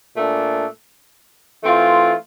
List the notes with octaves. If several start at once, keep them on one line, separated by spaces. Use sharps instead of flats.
A#2 A3 D4
E3 A3 C4 F4